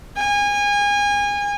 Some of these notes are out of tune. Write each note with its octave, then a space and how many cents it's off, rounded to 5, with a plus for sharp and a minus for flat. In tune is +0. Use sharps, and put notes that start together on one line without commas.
G#5 -30